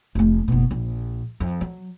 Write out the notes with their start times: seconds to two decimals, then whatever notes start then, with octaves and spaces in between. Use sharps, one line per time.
0.15 F1 A3
0.48 F#1 B2
0.71 A#1
1.40 F2
1.61 F#3